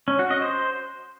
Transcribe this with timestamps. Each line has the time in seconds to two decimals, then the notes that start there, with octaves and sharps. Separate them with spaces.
0.08 C#4
0.19 F#4
0.31 D#5
0.42 C5